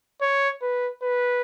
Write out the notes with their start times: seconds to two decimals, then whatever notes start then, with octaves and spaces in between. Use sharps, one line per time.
0.21 C#5
0.62 B4
1.03 B4